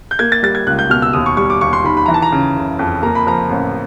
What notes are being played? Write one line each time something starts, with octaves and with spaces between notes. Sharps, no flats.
G6
A#3 G#6
A6
G3 A6
G#6
C#2 F#6
G6
B2 F6
E6
D#2 D#6
C#6
G3 C#6
D6
D#2 C#6
C6
D#3 B5
B5
E3 A#5
A5
A#5
C#3
F#1
F2
A#3 A#5
B5
F3 A#5
A1